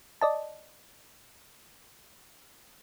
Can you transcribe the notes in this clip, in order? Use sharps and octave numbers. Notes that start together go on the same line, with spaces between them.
D5 D#5 A5